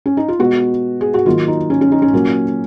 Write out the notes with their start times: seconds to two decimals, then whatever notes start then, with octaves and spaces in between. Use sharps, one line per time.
0.06 C#4
0.17 D#4
0.28 F4
0.39 B2 G#3 B3 F#4
1.01 G#4
1.14 F#4
1.26 D#3 F#3 A#3 F4
1.48 D#4
1.70 C#4
1.81 C#4
1.92 D#4
2.02 C#4
2.13 A#2 F#3 A#3